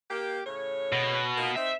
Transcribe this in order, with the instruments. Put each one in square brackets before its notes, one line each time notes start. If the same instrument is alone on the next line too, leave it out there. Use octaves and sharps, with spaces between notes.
[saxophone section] A#3 G4
A2 C#3 C#5
[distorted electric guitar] B2
[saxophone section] A#3 D#4 F4
[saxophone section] C4 D#4 [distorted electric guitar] E5